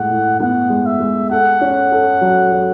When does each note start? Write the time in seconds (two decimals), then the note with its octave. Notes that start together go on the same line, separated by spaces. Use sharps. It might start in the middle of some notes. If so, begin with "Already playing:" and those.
Already playing: A2 G#3 F#5
0.10 A2
0.40 B3 F#5
0.70 G#3
0.86 E5
1.00 G#3
1.30 A4 F#5
1.61 C#4
1.92 A4
2.21 F#3
2.52 F#3